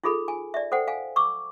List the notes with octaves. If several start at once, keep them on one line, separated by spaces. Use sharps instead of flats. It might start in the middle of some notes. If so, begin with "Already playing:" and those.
D#4 F4 G#4 A4 B5
G#5
D5 E5
A4 C5 F#5 G5
F5 G#5
C#6 D6 E6